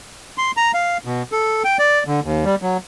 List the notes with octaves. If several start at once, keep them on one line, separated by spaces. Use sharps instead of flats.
C6
A#5
F5
B2
A4
G5
D5
D3
D#2
G3
F#3